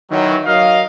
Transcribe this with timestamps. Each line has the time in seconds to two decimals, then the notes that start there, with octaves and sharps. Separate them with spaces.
0.11 D#3 E3 F#3
0.46 F#3 A#4 D#5 F5